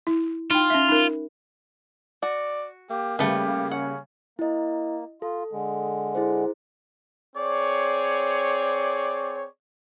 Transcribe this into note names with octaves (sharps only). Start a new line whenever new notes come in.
E4
D#4 F4 G5
C#4 E5
D#4 A#4
F#4 D5
A#3 G4
C#3 G3 A3 G4 B4
C#4 F#5
A#3 E4 D#5
F4 A4
D3 G#3
E4 G#4 C5
C4 G#4 C#5 D5